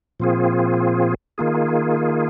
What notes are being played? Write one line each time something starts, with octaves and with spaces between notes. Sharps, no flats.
A#2 F3 C4 F4 G#4
D#3 A#3 F4 G#4